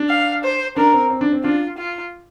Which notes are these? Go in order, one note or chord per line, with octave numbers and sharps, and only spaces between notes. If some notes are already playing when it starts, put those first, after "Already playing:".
Already playing: D4
F5
C5
D4 A#4
C4
C4
D4
C4
D4 F4
F4